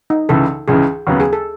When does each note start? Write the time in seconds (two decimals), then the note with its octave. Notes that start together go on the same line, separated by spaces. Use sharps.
0.10 D#4
0.29 C#2 C#3 E3 A4
0.68 C#2 C#3 E3 G#4
1.07 D#2 C#3 F#3 B3
1.20 G#4
1.33 A4